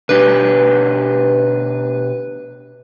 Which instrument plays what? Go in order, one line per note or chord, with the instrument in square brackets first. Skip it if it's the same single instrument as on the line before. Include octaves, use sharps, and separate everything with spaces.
[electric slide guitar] B2 D4 G4 [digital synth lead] B4